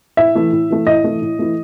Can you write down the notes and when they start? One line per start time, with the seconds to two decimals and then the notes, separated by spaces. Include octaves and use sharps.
0.17 A2 E5
0.35 E3 A3
0.52 A2
0.70 E3 A3
0.87 A2 D#5
1.04 E3 A3
1.22 A2
1.39 E3 A3